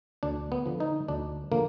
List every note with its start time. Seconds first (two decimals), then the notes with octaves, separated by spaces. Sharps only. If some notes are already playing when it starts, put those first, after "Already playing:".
0.23 D2 D4
0.52 B3
0.66 D3 F3
0.80 D#4
1.08 D2 D4
1.52 D3 F3 A#3